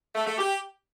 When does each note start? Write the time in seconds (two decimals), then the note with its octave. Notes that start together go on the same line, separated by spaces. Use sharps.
0.15 A3
0.27 A3
0.38 G4